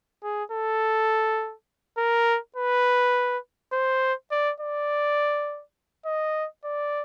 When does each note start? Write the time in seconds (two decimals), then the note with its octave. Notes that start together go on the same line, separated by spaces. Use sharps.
0.24 G#4
0.52 A4
1.98 A#4
2.56 B4
3.73 C5
4.31 D5
4.60 D5
6.06 D#5
6.64 D5